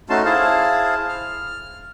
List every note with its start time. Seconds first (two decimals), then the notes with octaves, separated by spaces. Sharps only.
0.10 A3 C#4 D#4 F#4 A5 C6
0.25 E4 G#4 C5 F5 A5
1.09 F6